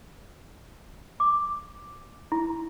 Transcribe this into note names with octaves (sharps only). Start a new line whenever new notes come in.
D6
E4